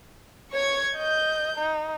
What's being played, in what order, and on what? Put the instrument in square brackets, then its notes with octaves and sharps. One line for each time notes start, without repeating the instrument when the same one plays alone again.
[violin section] C#5 C#6 G#6
[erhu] D#5 [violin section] G6
[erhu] D#4